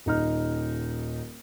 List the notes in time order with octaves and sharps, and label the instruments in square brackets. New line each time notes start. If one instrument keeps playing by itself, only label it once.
[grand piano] D#1 D#4 F6